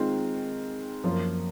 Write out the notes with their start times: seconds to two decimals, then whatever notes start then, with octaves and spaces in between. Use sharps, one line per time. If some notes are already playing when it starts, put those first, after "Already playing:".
Already playing: D#3 G#3 C4 F4
1.04 F#2 F3 A#3 F4